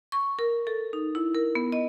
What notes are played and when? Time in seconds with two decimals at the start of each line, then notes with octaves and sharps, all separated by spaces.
0.12 C#6
0.39 A#4
0.67 A4
0.93 D#4
1.15 E4
1.35 A#4
1.55 B3
1.72 D#5